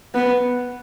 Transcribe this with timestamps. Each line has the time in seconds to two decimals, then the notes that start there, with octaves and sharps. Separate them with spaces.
0.15 B3